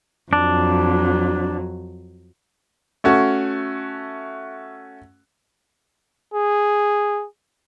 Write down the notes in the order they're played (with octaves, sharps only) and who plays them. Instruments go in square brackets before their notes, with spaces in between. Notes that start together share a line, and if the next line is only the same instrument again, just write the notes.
[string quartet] F2 F#3 [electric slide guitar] D4
[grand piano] A3 C#4 F#4
[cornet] G#4